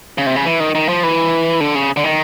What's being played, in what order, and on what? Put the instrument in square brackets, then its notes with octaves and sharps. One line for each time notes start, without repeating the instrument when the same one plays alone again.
[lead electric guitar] C#3
C3
C#3
E3
D#3
D#3
F3
E3
D3
C#3
D3
D#3